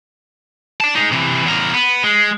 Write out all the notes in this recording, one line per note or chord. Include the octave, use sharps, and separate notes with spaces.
D5 A5
D#4 G#4
C3 E3
E2 A#4
B3
G#3